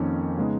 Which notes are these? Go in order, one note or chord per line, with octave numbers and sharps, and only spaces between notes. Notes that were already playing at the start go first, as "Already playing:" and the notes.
Already playing: F2 D#3 A#3 C#4
C#3 G#3 B3 D#4